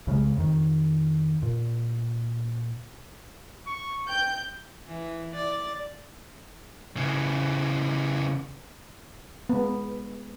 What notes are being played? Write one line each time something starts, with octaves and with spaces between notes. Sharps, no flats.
C2 C#3 E3 G#3
F2 D#3
A#2
C#6
G5 G6
E3
D5
C#3 E3
G#3 B3